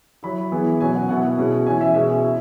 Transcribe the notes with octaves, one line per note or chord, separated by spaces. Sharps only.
F#3 E4 B5
E3 G#3 B3 E4
B2 F#3 C#4 G#5
F#5
B2 B3 E4 F#5
B2 G#3 C#4 E4
E3 C#4 E4 G#5
E5
B2 G#3 C#4 E5
E4